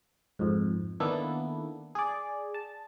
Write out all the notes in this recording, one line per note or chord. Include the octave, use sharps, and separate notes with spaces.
F2 G#2
D#3 A#3 B3 D4 E4 A4
G#4 D5
A5